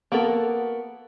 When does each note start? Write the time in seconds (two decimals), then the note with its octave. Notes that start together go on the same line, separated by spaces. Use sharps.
0.12 A#3 B3 F#4 A4 A#4